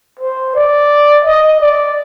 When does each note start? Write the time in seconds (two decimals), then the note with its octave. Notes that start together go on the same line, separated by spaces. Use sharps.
0.19 C5
0.55 D5
1.25 D#5
1.61 D5